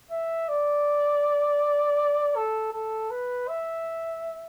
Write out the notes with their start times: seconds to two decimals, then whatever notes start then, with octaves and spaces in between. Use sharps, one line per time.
0.11 E5
0.48 D5
2.36 A4
2.73 A4
3.11 B4
3.48 E5